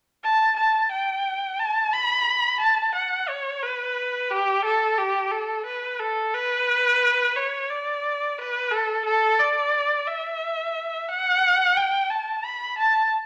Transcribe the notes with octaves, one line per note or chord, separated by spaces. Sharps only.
A5
A5
G5
A5
B5
A5
F#5
C#5
B4
G4
A4
G4
A4
B4
A4
B4
C#5
D5
B4
A4
A4
D5
E5
F#5
G5
A5
B5
A5